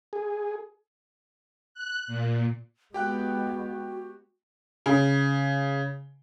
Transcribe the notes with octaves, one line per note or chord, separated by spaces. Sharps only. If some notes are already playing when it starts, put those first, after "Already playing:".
G#4
F#6
A#2
G#3 B3 F#4 G4 G5 F#6
C#3